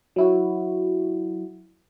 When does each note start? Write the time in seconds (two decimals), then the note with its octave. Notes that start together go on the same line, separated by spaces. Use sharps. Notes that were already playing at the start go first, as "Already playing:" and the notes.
0.16 F#3 E4 F#4